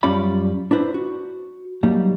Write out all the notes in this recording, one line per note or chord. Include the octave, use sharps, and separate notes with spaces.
F#2 G3 C#4 F4 D5 B5
D4 E4 B4 C5
F#4
F#3 G3 A#3 D#4